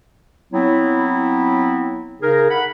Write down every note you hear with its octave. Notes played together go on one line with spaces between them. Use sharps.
F#3 B3 C4 E4
C#3 D#4 G#4 A#4
F#5 B5